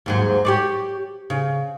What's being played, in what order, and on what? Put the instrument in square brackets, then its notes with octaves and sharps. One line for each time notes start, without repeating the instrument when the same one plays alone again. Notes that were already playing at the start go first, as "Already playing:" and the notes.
[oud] D#2 G#2 F#3
G4 C#5 D5
C#3